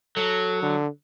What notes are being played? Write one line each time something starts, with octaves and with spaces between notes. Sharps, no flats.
F#3 A4
D3